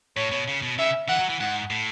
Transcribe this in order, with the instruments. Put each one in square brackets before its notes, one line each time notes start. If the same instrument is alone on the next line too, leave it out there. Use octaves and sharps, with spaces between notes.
[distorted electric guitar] A2 [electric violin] C#5
[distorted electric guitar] B2
C#3
B2
[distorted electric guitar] C#3 [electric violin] E5
[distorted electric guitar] E3 [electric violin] F#5
[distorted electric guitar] F#3
E3
[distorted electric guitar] G#2 [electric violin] F#5
[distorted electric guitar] A2